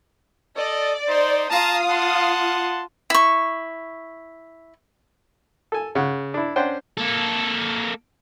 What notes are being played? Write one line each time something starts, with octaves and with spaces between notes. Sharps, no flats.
A4 D5 D#5
D#4 C5
F4 F5 A5 A#5 D#6
F#5 A5 C6
E4 C#6
A4 G#5
C#3 F#5
D4 E4
C#4 D4 C5 F#5 G5
A#3 A4